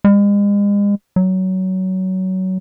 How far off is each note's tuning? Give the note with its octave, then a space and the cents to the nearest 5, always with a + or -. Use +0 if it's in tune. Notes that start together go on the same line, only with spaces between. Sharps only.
G#3 -40
F#3 +20